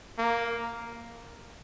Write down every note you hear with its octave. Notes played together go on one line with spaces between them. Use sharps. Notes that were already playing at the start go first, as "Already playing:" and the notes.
A#3